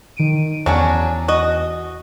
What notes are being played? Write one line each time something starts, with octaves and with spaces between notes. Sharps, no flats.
D#3 D7 D#7
E2 F#3 C#4 D4
F#4 D#5